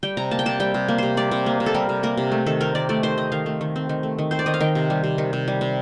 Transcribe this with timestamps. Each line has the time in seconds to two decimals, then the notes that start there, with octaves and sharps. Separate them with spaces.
0.03 G3 G5
0.17 C3 A#5
0.31 A#3 A5
0.39 G5
0.46 C3 A5
0.60 G3 G5
0.74 C3
0.88 A#3
0.98 C3 C5
1.17 G3 D5
1.31 C3
1.46 A#3
1.60 C3
1.66 A4
1.74 G3 A#4
1.89 C3
2.03 A#3 A#4
2.17 C3
2.32 A3
2.46 D#3 A4
2.61 C4 A#4
2.75 D#3 D5
2.89 A3 D5
3.03 D#3 C5
3.18 C4 D#5
3.32 D#3 F5
3.46 A3
3.61 D#3
3.76 C4
3.89 D#3
4.03 A3
4.19 D#3
4.31 C4 C5
4.39 D5
4.46 D#3 D#5
4.54 F5
4.61 D#3 G5
4.75 C3
4.90 G3
5.04 C3
5.18 D#3
5.33 C3
5.48 G3
5.61 C3